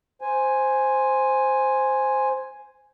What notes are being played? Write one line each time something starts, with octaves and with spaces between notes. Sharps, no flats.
C5 G#5